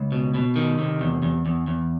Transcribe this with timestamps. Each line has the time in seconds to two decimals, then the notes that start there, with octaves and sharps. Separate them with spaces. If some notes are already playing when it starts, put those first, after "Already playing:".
Already playing: C#2
0.12 B2
0.34 B2
0.56 D#3
0.79 C3
1.01 E2
1.22 E2
1.46 E2
1.67 E2